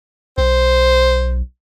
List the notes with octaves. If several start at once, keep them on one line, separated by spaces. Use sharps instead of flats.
B1 C5